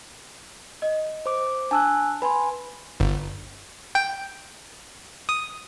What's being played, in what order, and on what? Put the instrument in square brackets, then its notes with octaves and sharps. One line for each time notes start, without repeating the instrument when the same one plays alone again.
[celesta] D#5
[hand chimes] C5 D6
[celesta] D4 A5 [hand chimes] G#5 E6 F#6
[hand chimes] B4 G#5 [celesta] B5 C6
[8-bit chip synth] G1
G5
D#6